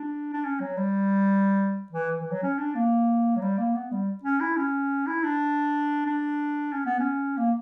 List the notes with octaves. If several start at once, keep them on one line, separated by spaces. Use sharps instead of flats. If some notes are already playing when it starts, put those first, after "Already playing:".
Already playing: D4
D4
C#4
F#3
G3
E3
E3
F#3
C#4
D4
A#3
F#3
G3
A#3
B3
G3
C#4
E4
C#4
E4
D4
D4
C#4
B3
C#4
A#3